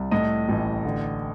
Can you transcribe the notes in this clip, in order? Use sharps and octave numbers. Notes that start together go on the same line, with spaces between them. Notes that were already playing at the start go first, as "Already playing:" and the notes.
Already playing: C2
A2 D#5
A1
D3